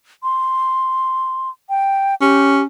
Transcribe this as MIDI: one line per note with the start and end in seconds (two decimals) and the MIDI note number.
0.23 1.49 84
1.69 2.15 79
2.21 2.65 61
2.21 2.63 67